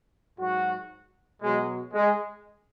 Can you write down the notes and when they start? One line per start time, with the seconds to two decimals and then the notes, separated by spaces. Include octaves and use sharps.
0.39 G#2 F#3 F#4
1.42 B2 F#3 G#3
1.94 G#3